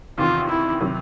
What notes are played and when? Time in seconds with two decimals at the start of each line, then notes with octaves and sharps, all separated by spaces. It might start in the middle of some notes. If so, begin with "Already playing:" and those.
0.18 E2 C3 D#3 F4
0.49 E4
0.80 C3 D#3 F#3